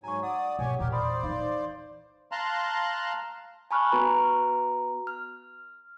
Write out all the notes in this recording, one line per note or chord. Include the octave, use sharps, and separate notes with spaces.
G#2 F#3 G#5 A#5 C#6
D5 F#5 D#6
B2 A#3 G4 C#5 G#5
E2 A#2 G4 A#4
C5 D5 B5 C6 D#6
E3 D#4 F5
F5 A5 A#5 C6 F#6
G#5 A5 B5 C#6 F6 F#6
B3 F#4 B4 A#5
F6